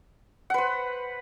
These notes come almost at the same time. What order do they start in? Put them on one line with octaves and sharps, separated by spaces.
F#5 B4 C5